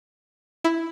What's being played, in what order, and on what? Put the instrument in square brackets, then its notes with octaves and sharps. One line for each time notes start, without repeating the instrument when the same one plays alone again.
[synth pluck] E4